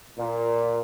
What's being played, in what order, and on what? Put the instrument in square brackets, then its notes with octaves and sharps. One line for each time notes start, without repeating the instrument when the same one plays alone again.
[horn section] A#2